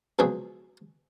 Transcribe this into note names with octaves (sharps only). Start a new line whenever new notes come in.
C#2 B2 F3 F#3 C4 G#4